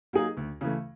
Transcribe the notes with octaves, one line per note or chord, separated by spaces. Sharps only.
F#3 A#3 D#4 G#4
D2
C#3 E3 A3